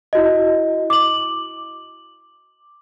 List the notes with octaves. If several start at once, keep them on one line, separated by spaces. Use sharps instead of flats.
E4 F#4 D#5
D6 F#7